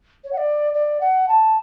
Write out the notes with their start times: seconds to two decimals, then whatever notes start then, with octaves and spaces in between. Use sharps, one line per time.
0.24 C#5
0.33 F#5
0.37 D5
0.74 D5
1.01 F#5
1.28 A5